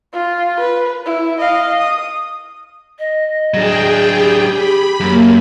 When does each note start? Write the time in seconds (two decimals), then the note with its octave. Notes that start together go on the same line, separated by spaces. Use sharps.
0.13 F4
0.60 B4
1.06 E4
1.40 D#5 F5
1.80 D#6
2.99 D#5
3.54 F#3 D4 G#4 G5
4.19 G4
4.53 B5
5.00 F#2 A#3